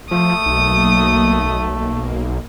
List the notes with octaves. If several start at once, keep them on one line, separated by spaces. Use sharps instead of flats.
F3 A3 D#6
B1 F#3 A#3
A#3